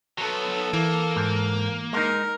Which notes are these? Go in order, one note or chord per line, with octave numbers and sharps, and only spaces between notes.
F#3 B3 A4
E3 A#3
G#2
G#3 D#4 A#4